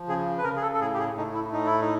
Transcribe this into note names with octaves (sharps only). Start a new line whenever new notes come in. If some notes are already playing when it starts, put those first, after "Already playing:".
Already playing: F3
C#3 G#4
B4
C#3 A#4
G#4
A4
A4
A2 G#4
G4
G#4
A3 D#4
E4
A2 D#4
E4
D#4